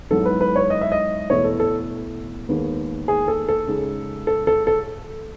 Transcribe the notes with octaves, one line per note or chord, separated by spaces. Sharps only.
G#2 F#3 B3 E4 A4
B4
B4
C#5
D#5
E5
D#5
E2 B2 A3 E4 C#5
A4
A4
D#2 D#3 G#3 B3
G#4
A4
A4
C#3 G#3 D#4
A4
A4
A4